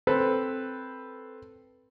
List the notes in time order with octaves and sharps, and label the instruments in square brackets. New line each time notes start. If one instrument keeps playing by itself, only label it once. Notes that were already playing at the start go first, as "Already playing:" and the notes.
[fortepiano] C4 A4 B4 C5